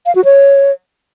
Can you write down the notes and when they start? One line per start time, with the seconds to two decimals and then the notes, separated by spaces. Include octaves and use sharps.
0.06 F5
0.15 F#4
0.25 C#5